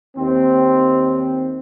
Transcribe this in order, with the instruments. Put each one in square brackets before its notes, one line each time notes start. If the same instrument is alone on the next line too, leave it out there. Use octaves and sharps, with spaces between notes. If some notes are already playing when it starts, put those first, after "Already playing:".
[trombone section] D#2 C4